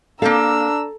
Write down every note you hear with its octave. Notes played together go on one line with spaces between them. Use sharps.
A#3 C4 D4 A4 F5 A#5 E6